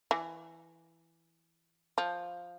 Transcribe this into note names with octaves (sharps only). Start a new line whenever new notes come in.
E3
F3